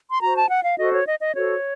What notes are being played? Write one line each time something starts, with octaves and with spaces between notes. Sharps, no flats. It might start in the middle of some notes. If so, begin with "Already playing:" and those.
C6
F#4 C5 A#5
A5
F#5
F5
F#4 A4 C5 D#5
C#5
D#5
D#5
F#4 A4 C5 C#5